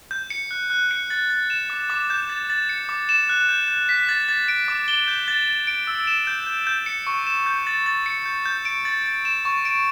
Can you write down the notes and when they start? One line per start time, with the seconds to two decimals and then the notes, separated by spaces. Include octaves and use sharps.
0.11 G6
0.30 C#7
0.51 F#6
0.70 F#6
0.91 C#7
1.10 A6
1.30 A6
1.50 E7
1.70 D6
1.90 D6
2.10 G6
2.29 A6
2.50 A6
2.69 C#7
2.89 D6
3.09 E7
3.29 F#6
3.49 G6
3.68 G6
3.89 B6
4.09 A6
4.29 A6
4.48 D7
4.68 D6
4.88 G7
5.08 G6
5.28 A6
5.48 A6
5.67 D7
5.87 E6
6.07 E7
6.27 G6
6.47 G6
6.67 G6
6.86 C#7
7.07 C#6
7.27 E7
7.46 G6
7.67 A6
7.86 A6
8.06 C#7
8.26 G6
8.46 G6
8.65 D7
8.85 A6
9.06 A6
9.25 E7
9.45 C#6
9.65 D7